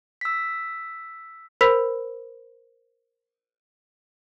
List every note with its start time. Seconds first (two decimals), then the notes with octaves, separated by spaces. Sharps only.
0.21 E6 B6
1.61 A#4 C5 B5 E6 B6 F7